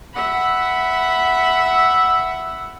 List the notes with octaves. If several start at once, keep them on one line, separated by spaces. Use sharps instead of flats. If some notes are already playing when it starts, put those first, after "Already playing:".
E5 F#5 B5